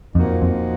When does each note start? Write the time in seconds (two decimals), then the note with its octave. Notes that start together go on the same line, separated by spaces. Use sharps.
0.15 F2 A#2 F3 A#3 D#4 F#4
0.42 F2